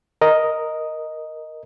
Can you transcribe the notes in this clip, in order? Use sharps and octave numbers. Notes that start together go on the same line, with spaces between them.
A#4 D#5